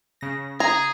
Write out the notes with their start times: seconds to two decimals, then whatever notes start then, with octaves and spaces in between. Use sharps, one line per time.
0.21 C#3 A#6
0.60 G#4 A#5